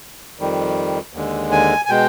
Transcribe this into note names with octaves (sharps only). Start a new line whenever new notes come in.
F2 D#3 G3
D#2 D3 G#3
G#5
G#5
B2 G#3 G5